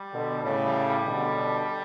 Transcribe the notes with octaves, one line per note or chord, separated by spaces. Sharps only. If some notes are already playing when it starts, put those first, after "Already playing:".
Already playing: G3
B2 D3
A2 C#3 G3
G3
G3
B2 D3